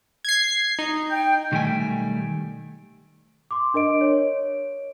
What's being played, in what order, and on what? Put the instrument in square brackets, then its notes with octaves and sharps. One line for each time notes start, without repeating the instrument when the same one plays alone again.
[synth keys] G#6 C7
D#4
[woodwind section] G5
[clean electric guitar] B1 D#3 G3 A3 G5 G#5
[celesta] C6 D6
D4 A#4 D#5 D7
C#5